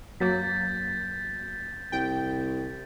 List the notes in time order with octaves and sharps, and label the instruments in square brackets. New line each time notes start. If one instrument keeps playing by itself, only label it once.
[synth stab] F#2 F#3 A#3 [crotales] G6 A6 B6
[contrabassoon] C2 [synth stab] G5